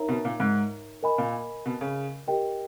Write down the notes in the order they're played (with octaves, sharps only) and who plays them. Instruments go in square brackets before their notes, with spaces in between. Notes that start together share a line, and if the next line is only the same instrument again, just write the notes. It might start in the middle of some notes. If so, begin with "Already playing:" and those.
Already playing: [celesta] D#4 A#4 C#5 E5 A#5
[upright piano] B2
A#2
G#2
[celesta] A#4 D#5 G#5 B5
[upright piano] A#2
B2
C#3
[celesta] G4 A#4 D#5 G5